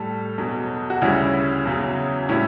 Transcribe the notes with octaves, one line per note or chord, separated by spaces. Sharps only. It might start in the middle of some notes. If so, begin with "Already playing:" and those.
Already playing: A2 G3 A4
E2 B2 F#3
F#4
D2 C#3 G3 C#4 E4
E2 C#3 F#3
A2 G3 C#4 E4